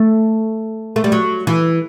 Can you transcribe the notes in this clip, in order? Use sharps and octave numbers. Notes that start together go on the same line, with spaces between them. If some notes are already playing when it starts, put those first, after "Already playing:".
Already playing: A3
A3
G3
F#3
E3